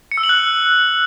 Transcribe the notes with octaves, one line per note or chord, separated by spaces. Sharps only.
C#7
E6
F#7
F#6